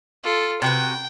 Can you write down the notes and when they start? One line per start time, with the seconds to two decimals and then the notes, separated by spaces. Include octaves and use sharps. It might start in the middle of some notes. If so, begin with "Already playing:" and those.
0.23 F4 A4
0.62 C3 F#4 B4 G5